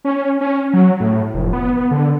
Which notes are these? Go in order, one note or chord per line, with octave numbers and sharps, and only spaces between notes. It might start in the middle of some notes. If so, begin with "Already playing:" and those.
C#4
C#4
F#3
A2
F1
B3
D3